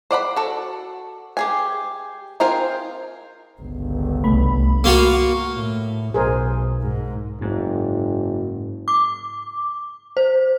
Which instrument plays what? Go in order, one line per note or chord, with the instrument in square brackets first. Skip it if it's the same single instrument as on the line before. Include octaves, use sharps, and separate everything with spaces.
[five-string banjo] C5 D5 F#5 B5
F#4 A4
G4 G#4 G#5
C4 F4 G#4 A#4 C5
[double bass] G1 C#2
[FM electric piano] C2 A3 B5
[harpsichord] A#3 F4 F#4
[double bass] A2
[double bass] B1 [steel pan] G#4 A#4 C5
[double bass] G#2
[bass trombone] F#1 [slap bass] G#2
[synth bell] D6
C5